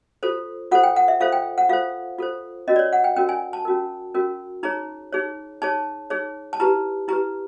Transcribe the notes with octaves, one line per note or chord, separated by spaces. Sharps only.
F4 A4 C5
F4 A4 C5 F#5
G5
F#5
E5
F4 A4 C5 F5
G5
F#5
F4 A4 C5 F5
F4 A4 C5
C#4 F#4 A#4 D#5
D5
C#5
F#5
G5
C#4 F#4 A#4 G5
G#5
A5
C#4 F#4 A#4
C#4 F#4 A#4
D#4 G#4 C#5 A#5
D#4 G#4 C#5
D#4 G#4 C#5 A5
D#4 G#4 C#5
A5
E4 G4 B4 A#5
E4 G4 B4 A#5